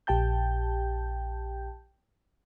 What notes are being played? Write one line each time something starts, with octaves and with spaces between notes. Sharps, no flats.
A#1 G4 G5 A5 G6